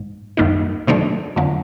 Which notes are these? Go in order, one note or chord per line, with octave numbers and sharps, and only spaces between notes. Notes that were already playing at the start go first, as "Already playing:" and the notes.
Already playing: G#2
F#2 D#3 G3 A#3 D#4
C3 D#3 F#3 A3 D4
F2 D3 F#3